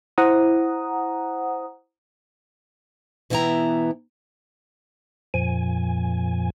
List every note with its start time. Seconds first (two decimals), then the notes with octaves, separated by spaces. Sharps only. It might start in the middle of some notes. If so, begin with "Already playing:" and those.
0.18 E4 C5 F#5 A#5 D#6
3.30 B2 E3 B3 E4 G5 A#5
5.34 F2 A#2 F3 G#5